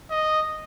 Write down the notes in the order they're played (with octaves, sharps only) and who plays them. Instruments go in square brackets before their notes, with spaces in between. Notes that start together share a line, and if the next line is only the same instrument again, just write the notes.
[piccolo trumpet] D#5